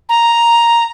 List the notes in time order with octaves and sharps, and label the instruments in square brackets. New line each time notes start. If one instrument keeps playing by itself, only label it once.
[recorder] A#5